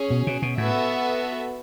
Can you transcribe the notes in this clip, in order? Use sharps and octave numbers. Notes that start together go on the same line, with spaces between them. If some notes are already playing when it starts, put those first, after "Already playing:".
Already playing: C#4 G#4 C#5
B2
B2
B2
A2 B3 F#4 A4 E5